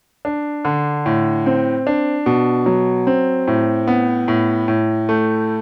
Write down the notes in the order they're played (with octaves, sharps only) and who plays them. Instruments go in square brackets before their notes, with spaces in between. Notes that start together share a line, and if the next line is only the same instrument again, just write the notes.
[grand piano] D4
D3
A2
C4
D4
B2
F#3
C4
A2
B3
A2
A2
A3